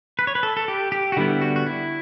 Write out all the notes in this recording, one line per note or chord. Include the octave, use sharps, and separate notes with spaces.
B4
C#5
B4
A4
A4
G4
G4
F#4
D3 G3 B3 E4
F#4
F#4
E4